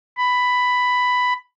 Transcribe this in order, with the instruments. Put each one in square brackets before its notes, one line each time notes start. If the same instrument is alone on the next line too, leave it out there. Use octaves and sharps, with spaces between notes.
[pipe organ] B5